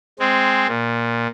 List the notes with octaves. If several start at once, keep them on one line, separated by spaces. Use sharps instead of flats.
G#3 C4
A#2